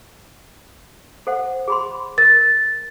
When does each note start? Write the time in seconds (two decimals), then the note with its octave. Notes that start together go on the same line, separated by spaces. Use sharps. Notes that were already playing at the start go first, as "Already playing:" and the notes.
1.27 A4 C5 F#5
1.68 G#4 B5 C6
2.18 A#4 A6